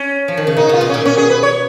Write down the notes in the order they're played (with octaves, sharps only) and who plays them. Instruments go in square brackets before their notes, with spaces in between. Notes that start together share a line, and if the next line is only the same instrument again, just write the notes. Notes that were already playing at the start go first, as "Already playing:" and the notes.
Already playing: [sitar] C#4
[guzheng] F3
D#3
C#3
[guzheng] B2 [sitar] D#4
[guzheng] C#3 [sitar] F4
[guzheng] B2
[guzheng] A#2 [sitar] C#4
[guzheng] B2 [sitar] C#4
[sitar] G#4
B4
C#5